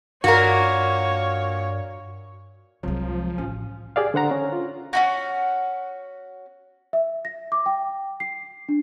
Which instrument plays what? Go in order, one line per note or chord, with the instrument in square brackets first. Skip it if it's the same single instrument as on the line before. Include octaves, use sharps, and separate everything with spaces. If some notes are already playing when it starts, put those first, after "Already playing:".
[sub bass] G2 [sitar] A#2 A#3 [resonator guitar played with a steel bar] F#4 A#4 [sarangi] C#5
[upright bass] C2 G#3 [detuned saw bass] F3 [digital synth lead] F#3
[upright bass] A1 [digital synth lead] C#4
[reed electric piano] G4 G#4 D5 F5
D3 C5 F#5 A#5
C#4
F4
[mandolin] C#4 F4 F#4
[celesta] E5
A#6
D6
G5
C7
D4